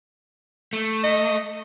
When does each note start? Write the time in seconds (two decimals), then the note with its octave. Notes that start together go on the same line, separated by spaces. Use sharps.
0.73 A3
1.04 D#5